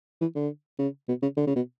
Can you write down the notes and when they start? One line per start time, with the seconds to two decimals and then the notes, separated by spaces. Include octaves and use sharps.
0.21 E3
0.35 D3
0.79 C#3
1.09 B2
1.22 C#3
1.37 D3
1.47 C#3
1.56 B2